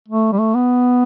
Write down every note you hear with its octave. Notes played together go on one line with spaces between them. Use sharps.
A3
G3
A3
B3